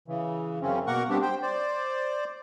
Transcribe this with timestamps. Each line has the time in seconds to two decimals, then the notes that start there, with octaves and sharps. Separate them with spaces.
0.08 C#3 E3
0.61 F#2 C#3 C4 C#4
0.87 B2 A#3 A#4 F#5 C#6
1.09 G3 B3 C4 D4 G4
1.22 C5 G5
1.42 C5 D5